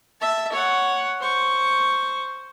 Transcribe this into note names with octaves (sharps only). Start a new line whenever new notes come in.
E5 A5
C#5 F#5
C5 C#6